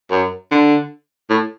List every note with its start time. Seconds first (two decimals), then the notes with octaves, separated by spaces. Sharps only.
0.11 F#2
0.51 D3
1.30 A2